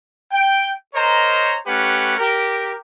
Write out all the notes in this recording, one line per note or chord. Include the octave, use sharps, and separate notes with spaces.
G5
A#4 C5 C#5 D#5 A#5
A3 C#4 G4 B4 F#5
G4 A#4